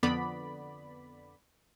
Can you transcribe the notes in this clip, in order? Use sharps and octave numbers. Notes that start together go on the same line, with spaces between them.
F2 D3 B3 D5 B5